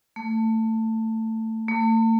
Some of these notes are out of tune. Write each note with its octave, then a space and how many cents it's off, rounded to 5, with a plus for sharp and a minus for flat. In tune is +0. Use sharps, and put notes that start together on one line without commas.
A3 +20
A3 +40